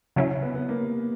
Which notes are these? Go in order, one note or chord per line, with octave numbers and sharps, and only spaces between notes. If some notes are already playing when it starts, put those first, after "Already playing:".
C#3 F#3 C#4 E4
B3
B3
A#3